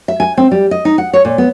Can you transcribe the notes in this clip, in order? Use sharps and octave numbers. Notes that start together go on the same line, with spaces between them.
E5
G#5
C4
G3
D#5
D#4
F#5
C#5
A#2
B3